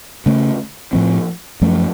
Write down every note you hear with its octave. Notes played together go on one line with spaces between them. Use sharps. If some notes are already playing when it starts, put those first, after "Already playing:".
C#3 A3 C#4
A2 F3 C4
F#2 F3 A3 C#4